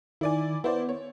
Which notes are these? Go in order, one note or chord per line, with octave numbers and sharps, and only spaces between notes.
D#3 E4 D5 G#5
B3 E4 C5 D5
C#5